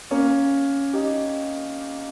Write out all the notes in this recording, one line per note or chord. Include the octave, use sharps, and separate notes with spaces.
A#3 C#4
D#4 G4